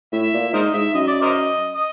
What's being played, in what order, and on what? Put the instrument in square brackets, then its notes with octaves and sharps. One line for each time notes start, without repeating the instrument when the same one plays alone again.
[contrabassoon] A2 [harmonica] E5
[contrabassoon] A#2
[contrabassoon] G#2 [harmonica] A#4 C5 D#5
[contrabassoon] G#2 [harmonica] E5
[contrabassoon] F#2 [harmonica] D#5
[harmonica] D5
A#4 C5 D#5
D#5